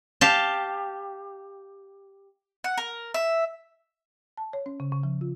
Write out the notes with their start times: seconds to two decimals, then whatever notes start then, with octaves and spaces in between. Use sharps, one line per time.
0.21 G4 F5 A5
2.64 F#5
2.78 A#4
3.14 E5
4.37 A5
4.53 C#5
4.66 C#4
4.80 C#3
4.92 C#3
5.03 F3
5.21 F4